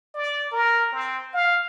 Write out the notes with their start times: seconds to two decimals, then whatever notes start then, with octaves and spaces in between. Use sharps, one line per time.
0.14 D5
0.52 A#4
0.92 C4
1.34 F5